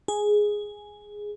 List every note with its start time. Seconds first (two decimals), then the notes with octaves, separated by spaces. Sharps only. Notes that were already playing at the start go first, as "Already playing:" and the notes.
0.08 G#4